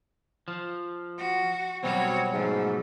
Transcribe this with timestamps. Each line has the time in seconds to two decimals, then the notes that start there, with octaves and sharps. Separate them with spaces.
0.48 F3
1.18 F#4
1.84 B2 F#3 G3 C4 F#4 C#5
2.33 G#2 F3 A3